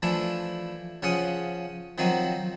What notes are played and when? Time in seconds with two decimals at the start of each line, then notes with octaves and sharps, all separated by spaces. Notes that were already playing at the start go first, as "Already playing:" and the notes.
0.02 E3 F3 A3 D4 E4
1.02 C#3 F3 C#4 F#5 D#6
1.98 D#3 F3 F#3 C4 D#4 F#4